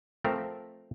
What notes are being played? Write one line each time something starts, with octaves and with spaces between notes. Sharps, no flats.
F3 A3 C4 A#4